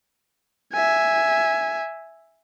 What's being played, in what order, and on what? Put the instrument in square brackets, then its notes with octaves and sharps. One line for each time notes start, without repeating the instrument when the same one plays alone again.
[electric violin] E5 G#5